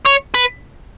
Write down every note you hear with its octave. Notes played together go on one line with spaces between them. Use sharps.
C#5
B4